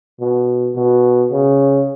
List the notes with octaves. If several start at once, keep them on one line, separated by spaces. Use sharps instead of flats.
B2
B2
C#3